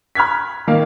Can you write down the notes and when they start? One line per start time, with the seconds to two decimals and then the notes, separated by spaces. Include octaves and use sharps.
0.15 B5 F6 F#6 G#6 B6
0.67 D#3 A#3 F5